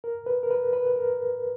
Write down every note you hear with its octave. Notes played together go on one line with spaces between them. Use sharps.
A#4
B4
A#4
B4
B4
B4
A#4